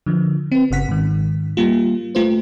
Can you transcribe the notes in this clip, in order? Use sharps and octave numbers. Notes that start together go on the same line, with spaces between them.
D3 F3
C4 B4
G1 C#3 F#5 B6
G#2 D#3
G3 A#3 F4
A3 F4 B4 C5